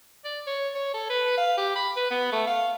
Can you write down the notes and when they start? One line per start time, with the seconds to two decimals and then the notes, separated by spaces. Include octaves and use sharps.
0.24 D5
0.47 C#5
0.74 C#5
0.94 A4
1.09 B4
1.37 F5
1.57 G4
1.75 B5
1.96 B4
2.11 B3
2.32 A3
2.47 F5